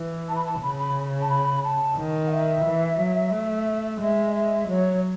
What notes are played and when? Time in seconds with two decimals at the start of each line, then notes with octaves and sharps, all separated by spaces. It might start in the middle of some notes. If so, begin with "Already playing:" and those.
Already playing: E3
0.28 A5
0.35 B5
0.45 A5
0.62 C#3 B5
0.79 B5
1.20 A5
1.29 B5
1.63 A5
1.96 D#3
2.26 F#5
2.31 E5
2.65 E3
2.99 F#3
3.32 A3
4.01 G#3 E5
4.34 E5
4.68 F#3 C#5